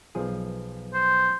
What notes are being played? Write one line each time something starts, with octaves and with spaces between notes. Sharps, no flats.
B1 F3 G#4
C5